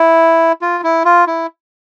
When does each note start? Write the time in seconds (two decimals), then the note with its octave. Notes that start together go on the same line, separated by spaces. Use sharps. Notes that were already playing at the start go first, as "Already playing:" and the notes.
Already playing: E4
0.62 F4
0.83 E4
1.05 F4
1.27 E4